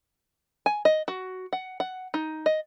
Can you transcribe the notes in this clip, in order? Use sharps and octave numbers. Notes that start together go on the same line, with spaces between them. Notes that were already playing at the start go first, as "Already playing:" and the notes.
G#5
D#5
F#4
F#5
F#5
D#4
D#5